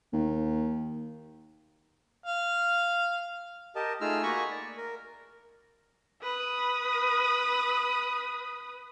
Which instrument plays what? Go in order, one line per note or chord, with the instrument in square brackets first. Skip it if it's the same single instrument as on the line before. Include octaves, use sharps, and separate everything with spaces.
[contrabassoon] D#2
[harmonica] F5
[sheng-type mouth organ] G4 A#4 D#5 A5
A3 D#4 F4 G#4 E6 F6
A#3 F#4 G#5 A#5 B5 C#6
D5
A#4
[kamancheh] B4 D#6